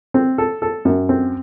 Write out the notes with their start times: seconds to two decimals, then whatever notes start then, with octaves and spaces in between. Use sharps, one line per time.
0.14 C4
0.38 A4
0.62 A4
0.85 F#2
1.09 C4